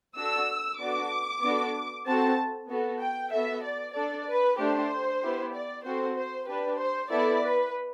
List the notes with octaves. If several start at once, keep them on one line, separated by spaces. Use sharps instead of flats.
D4 F#4 A4 E6
B3 D4 F#4 A4 D6
B3 D4 F#4 A4
C4 F#4 A4 A5
B3 F#4 A4
G5
B3 F#4 A4 E5
D5
D4 A4 D5
B4
A3 D4 G4 C5
B3 E4 G4
D5
C4 F#4 A4 C5
C5
D4 G4 B4
C5
B3 E4 A4 D5
B4